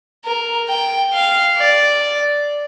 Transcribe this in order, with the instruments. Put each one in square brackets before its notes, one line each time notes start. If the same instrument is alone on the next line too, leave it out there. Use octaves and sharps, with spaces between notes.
[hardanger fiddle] A#4
G5
F5
D5